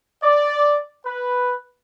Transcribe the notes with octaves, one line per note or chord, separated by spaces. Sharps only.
D5
B4